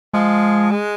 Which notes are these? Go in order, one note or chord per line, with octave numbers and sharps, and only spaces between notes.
F3 G#3
G#3